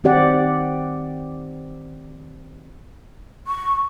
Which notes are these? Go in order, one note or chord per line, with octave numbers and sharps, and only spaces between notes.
D#3 C4 G4 D5 F#5
C#6